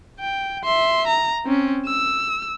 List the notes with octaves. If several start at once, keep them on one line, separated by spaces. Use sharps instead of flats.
G5
E5 C6
A#5
C4 C#4
E6